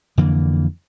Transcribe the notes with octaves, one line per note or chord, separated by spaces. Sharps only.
F2 D3 E3 A#3